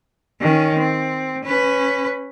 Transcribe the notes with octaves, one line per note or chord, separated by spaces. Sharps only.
D#3 C#4
C4
C#4 B4